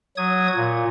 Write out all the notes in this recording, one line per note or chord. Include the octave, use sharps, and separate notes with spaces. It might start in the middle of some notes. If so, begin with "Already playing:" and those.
F#3 D#6 G#6
A#2